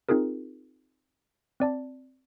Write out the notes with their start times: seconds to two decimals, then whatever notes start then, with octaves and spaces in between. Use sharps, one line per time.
0.09 C4 D#4 F4 G#4 A#4
1.60 C4 D5 A5